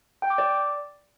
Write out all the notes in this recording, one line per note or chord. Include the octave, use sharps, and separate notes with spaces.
G5
D6
D5